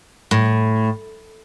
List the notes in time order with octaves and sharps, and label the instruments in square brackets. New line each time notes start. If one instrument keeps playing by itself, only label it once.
[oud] A2